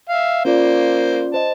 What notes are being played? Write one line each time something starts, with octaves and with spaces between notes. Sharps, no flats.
E5 F5
A#3 C#4 F4 C5 D5
C5 D#5 A5